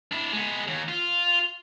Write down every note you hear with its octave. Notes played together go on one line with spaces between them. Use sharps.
D4 E4
G#3 B3
D#2
F4